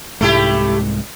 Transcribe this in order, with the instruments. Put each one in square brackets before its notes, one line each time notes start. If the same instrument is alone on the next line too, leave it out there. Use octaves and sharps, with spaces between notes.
[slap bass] C2 G#2 G#3 [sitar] A3 E4 G4